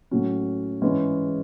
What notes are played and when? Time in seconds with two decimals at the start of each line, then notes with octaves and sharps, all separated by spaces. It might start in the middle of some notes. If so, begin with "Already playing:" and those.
0.11 A2 F#3 C#4
0.82 G#2 E3 G#3 C#4